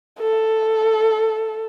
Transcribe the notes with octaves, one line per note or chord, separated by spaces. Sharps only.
A4